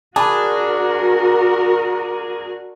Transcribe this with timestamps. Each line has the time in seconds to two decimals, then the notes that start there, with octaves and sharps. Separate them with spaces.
0.16 D4 F#4 G#4 A#4 A5 B5